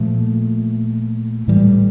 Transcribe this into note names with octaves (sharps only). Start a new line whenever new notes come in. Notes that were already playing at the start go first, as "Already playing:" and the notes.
Already playing: A#2 F3 A3
A2 E3 G3